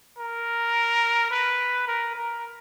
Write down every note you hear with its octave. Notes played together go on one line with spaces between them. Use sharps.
A#4
B4
A#4
A#4